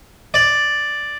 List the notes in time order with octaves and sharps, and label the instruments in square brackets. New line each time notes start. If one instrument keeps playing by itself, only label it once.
[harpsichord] D5